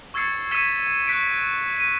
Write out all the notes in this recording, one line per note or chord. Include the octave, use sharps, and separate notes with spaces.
C#6 E6 G#6 A6 C7 C#7
E6 G#6 B6 C#7 D#7 E7
C#6 F#6 B6 C#7 D7
D#7